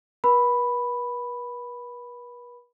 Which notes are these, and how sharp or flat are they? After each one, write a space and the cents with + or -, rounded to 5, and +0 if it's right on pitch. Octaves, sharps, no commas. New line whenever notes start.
B4 -40 B5 +0